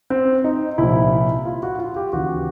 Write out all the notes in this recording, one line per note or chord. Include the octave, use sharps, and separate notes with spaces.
C4
D#4
C2 A#2 F3 E4
F4
F#4
F4
G4
D#2 C#3 E3 F#4